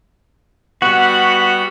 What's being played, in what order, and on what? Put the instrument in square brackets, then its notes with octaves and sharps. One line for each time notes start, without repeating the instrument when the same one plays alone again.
[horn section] G3 B3 B5 [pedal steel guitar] F#4